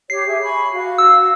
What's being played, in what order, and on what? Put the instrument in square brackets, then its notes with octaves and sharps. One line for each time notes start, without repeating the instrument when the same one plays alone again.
[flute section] G4 C#5 [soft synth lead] C7
[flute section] G#4 E5
G#5 B5 C#6
F#4 F5
[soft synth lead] E6